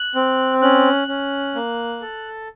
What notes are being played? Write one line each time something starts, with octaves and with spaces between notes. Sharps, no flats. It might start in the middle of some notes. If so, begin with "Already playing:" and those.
Already playing: F#6
C4
C#4 F#6
C#4
A#3
A4